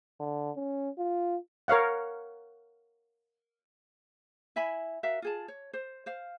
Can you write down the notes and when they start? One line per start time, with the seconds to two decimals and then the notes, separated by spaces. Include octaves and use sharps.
0.20 D3
0.56 C#4
0.98 F4
1.68 A#4 C#5 F5 F#5
4.56 E4 E5 G#5 B5
5.03 F#4 A#4 E5 F5
5.22 F4 G#4 A5
5.48 C#5
5.73 C5
6.06 C5 F5